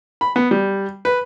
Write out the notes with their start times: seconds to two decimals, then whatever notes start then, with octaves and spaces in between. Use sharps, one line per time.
0.21 B5
0.36 B3
0.51 G3
1.05 B4